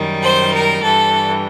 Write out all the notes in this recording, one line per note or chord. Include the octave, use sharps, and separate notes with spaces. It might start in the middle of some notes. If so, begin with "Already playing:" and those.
Already playing: F#2 D#3 G3
C5
A#4
G2 E3 G3 A4